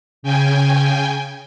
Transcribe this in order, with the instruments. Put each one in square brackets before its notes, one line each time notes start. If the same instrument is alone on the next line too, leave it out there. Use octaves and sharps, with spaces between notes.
[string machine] C#3 G5 G#5